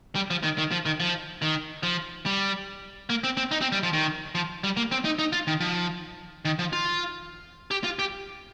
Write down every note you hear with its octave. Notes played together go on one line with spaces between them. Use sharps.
G3
F3
D#3
D#3
F3
D#3
F3
D#3
F3
G3
A#3
C4
C4
D#4
C4
G3
F3
D#3
F3
G3
A#3
C4
D#4
D#4
F4
D#3
F3
D#3
F3
F4
G4
F4
G4